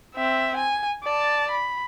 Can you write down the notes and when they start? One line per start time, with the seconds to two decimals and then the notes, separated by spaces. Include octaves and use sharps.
0.15 C4 E5
0.57 G#5
1.03 D5 A5
1.51 B5